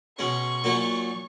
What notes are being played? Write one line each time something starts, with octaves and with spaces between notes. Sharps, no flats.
B2 G#3 C#4 C#6
A#2 F#3 A#3 D#4